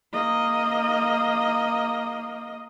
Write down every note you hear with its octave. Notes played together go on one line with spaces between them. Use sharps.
A#3 D#5